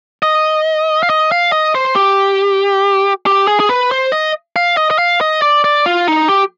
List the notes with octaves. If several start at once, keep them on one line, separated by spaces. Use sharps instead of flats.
D#5
F5
D#5
F5
D#5
C5
G4
G4
G#4
G#4
B4
C5
D#5
F5
D#5
D#5
F5
D#5
D5
D5
F4
D#4
G4